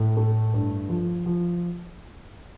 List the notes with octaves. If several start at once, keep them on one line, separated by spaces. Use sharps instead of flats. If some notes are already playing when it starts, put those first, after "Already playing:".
Already playing: A2
A3
G2
F3
F3